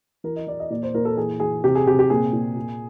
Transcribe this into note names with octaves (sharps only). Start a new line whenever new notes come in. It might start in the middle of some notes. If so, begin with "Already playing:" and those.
E3 A#4
D#5
E3 D5
D#5
A#2 D5
C5
A#2 A#4
A4
E3 G#4
E3 G#4
C3 G4
G#4
C3 G4
G4
A#2 G#4
A#2
A#2